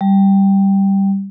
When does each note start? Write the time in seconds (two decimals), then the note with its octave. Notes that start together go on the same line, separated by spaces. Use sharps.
0.01 G3